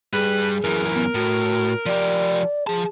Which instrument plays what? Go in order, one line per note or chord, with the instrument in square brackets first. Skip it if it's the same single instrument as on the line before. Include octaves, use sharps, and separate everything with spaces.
[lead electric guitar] G2 G3 [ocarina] G#4 [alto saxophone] B4
[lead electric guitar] F#2 E3 [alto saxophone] A#4
[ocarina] B3
[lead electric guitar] A2 [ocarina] F#4
[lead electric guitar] F3 G4 [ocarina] D5
[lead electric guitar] F3 A5 [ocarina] G#4